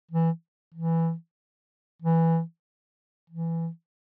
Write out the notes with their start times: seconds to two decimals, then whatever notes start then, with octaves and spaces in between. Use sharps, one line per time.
0.11 E3
0.75 E3
2.02 E3
3.30 E3